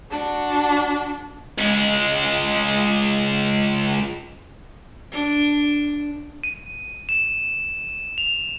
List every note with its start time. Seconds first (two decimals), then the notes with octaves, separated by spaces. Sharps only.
0.11 D4 F#4
1.58 C#2 G#3
5.12 D4
6.44 D#7
7.09 E7
8.18 F7